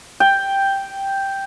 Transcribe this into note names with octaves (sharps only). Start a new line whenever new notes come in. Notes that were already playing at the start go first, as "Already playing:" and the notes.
G5